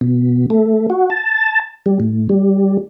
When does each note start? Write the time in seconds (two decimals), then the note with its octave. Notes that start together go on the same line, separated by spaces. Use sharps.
0.01 B2
0.50 A3
0.90 F#4
1.10 A5
1.86 G3
2.00 A2
2.29 G3